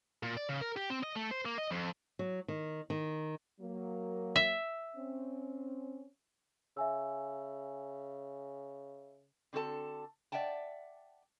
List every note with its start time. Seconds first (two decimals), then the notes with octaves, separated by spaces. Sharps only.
0.23 A#2
0.37 D5
0.49 C#3
0.61 A#4
0.76 G4
0.90 C4
1.03 D#5
1.16 A3
1.31 C5
1.45 A#3
1.58 D#5
1.71 F2
2.19 F#3
2.48 D#3
2.90 D#3
3.61 F#3 A#3
4.36 E5
4.96 C4 C#4
6.77 C#3 E5 G#5 E6
9.53 D3 C4 F#4 A4 A5
10.32 D5 E5 F#5 G5 A5